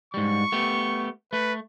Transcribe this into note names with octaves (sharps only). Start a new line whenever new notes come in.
G#2 G3 C#6
A3 B3 G4
A3 B4